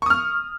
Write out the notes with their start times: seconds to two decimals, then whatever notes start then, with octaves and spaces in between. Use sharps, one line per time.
0.02 C#6
0.06 D#6
0.10 F6